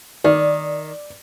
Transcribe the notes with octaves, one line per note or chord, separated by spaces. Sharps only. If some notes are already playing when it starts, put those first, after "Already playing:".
D#3 D5